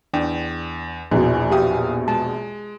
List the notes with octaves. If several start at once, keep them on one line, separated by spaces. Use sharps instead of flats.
E2 D4 G5
A#1 E2 B2 E3
G4 E5 F5 D#6
G#3 A5